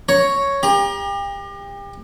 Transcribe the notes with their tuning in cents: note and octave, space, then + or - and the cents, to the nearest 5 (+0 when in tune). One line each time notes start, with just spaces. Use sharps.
C#5 +0 A#5 +0
G4 +35 A#5 +30